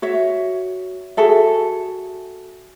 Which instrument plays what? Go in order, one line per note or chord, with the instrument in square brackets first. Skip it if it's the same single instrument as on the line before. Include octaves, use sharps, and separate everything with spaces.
[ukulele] F#4 C#5 E5
F#4 G#4 A4 E5